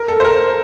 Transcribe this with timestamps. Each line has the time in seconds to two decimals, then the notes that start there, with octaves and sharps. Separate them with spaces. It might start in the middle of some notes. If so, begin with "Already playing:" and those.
Already playing: A#4
0.08 A4
0.20 C5
0.24 A#4